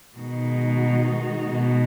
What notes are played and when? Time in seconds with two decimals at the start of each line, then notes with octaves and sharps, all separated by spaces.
0.17 B2 D#3 G#3 D#4 F#4
1.50 B2